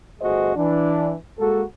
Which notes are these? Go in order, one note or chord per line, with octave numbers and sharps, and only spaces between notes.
G1 A3 F#4 G#4 C5 D#5
E3 D4
G#3 A#3 F#4 A4